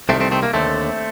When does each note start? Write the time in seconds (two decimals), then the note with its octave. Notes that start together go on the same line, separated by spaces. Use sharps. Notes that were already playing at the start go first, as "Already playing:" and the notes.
0.09 C2 C3 D#3 A3 C4
0.20 A3 C4
0.32 A3 C4
0.43 A#3
0.54 D#2 D3 A3 C4